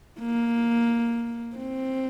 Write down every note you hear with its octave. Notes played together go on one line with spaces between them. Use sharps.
A#3
C4